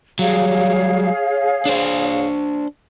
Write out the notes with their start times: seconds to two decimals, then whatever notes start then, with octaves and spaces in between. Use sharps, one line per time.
0.19 F#3 G3 G#4 C#5 F5
1.66 D4 C5